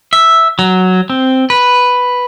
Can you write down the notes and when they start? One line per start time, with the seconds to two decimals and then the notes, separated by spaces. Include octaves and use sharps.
0.13 E5
0.59 F#3
1.10 C4
1.50 B4